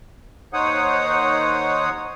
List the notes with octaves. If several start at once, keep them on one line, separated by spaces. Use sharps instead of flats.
D#2 D#4 C5 C#5 F#5 D#6